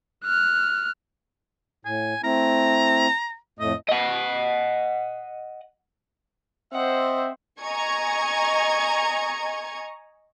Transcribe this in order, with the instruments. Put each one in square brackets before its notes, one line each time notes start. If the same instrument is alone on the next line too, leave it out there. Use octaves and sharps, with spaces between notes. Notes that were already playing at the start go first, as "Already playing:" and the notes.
[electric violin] F6 F#6
[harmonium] A2 [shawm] G#5
[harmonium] A3 C4 E4 [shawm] A#5
[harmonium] F2 A2 A3 [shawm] D#5
[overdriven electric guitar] D#5 F#5
[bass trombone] C4 [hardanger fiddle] C5 F#5 [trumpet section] D#5 E5
[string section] D#5 G#5 A#5 C#6 G#6